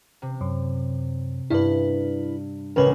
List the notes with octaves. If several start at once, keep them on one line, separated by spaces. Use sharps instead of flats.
C3
F#2
G2 E4 B4
C#2 A2 C#3 A#4 B4 C#5